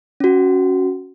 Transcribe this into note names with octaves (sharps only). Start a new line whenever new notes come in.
C#4 F#4